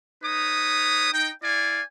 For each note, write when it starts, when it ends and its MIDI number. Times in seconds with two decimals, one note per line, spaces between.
0.23 1.08 63
0.23 1.08 71
0.23 1.08 73
0.23 1.08 87
1.13 1.32 63
1.13 1.32 79
1.43 1.82 64
1.43 1.82 74
1.43 1.82 77
1.43 1.82 80